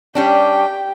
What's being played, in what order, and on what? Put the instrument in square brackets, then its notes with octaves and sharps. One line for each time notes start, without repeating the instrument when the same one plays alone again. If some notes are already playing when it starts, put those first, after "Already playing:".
[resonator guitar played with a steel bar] G3 C#4 D4 [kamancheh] G4 G5